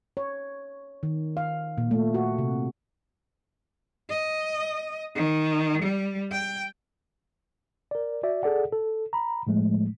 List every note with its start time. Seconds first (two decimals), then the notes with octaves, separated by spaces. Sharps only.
0.17 C#5
1.03 D#3
1.37 F5
1.78 A#2
1.91 A3
2.14 F#4
2.38 C3
4.10 D#5
5.15 D#3
5.82 G3
6.31 G5
7.91 A#4 D5
8.23 F#4 D5 E5
8.43 G#4 A4 D5 F#5
8.72 A4
9.13 A#5 B5
9.47 A2 F3 G#3 A3